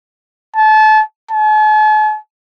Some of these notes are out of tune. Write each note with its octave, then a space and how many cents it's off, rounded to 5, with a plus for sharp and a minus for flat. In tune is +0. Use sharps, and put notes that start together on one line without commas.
A5 -30
A5 -45